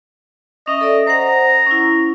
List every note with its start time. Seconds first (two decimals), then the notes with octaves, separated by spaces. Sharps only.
0.68 C#4 D#5 E5
0.81 A4 D5 E5
1.07 C5 F#5 A#5
1.67 C#4 E4